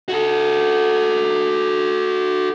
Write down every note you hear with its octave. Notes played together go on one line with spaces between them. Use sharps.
F#4 A4